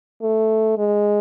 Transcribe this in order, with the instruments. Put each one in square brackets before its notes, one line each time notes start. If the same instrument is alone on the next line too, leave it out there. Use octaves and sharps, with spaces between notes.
[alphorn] A3
G#3